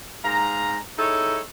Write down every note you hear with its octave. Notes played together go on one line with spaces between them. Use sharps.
G#2 F5 A#5
D#4 E4 G#4 A4 C#5